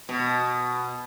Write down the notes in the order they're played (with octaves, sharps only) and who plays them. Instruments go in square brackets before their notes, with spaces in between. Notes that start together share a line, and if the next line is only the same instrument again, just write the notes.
[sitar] B2